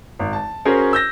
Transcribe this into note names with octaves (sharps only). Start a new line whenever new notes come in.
G#1
A5
C#4 F#4 G#4 A#4 C5 C#5
E6 G6 A#6